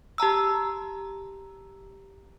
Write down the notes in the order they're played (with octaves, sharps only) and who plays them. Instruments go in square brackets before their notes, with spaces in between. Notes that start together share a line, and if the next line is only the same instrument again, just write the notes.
[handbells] G4 A5 A#5 E6